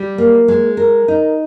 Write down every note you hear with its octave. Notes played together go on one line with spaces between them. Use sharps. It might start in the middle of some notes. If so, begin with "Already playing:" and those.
Already playing: G3
A#3
G#3
A#4
D#4